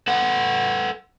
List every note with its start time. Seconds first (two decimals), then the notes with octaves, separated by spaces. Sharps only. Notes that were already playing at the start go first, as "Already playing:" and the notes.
0.07 A4 B4 F#5